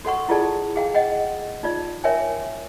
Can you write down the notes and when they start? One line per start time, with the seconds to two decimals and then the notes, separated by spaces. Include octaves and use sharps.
0.05 F#4 A4 F#5 C#6
0.29 E4 F4 G#4 A4 D5 A5
0.76 G#4 F5 G5
0.95 D#5 F#5 G5
1.63 D#4 F4 D5
2.04 A#4 C#5 E5 G5 G#5